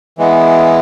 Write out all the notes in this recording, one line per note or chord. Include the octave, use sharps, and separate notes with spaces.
E3 G#3 B3